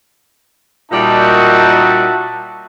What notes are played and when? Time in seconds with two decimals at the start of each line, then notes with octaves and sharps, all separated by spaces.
0.92 A#2 G3 D#4 F#4 E5 A5